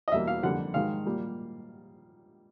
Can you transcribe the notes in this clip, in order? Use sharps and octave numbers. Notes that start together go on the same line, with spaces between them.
D#5
E2 B2 G3 A#3 E5
F5
F2 D3 G3 A#3 F#5
G#2 D#3 G#3 F5
A#2 G3 A#3